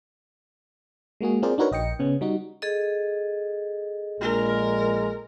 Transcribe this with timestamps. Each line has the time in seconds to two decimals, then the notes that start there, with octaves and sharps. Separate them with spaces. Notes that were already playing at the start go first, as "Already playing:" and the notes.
1.21 G#3 A#3 F#4 G#4
1.43 C4 F4 G#4 A#4 C5 D5
1.58 D4 D#4 F#4 A#4 B4 C#5
1.72 A#1 D#5 G5 C#7
1.99 C#3 B3 C#4
2.21 G3 D#4 F#4
2.62 G#4 A4 D#5
4.21 A#1 A#2 G#3 A#4